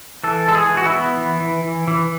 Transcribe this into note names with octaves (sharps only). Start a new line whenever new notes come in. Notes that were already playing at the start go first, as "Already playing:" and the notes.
E3 A4
G#3 A4
G#4
E3
F#4
E4
B3
E3
E3
E3
E3